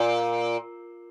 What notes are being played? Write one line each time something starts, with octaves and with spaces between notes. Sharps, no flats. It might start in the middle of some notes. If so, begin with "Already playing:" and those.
Already playing: A#2